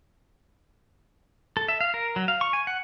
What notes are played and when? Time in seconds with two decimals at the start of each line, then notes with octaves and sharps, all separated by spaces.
1.57 A4
1.68 E5
1.81 F5
1.94 A#4
2.16 F#3
2.28 F5
2.41 C#6
2.53 G#5
2.67 F#5